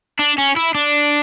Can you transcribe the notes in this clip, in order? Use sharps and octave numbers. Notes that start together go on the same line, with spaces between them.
D4
C#4
E4
D4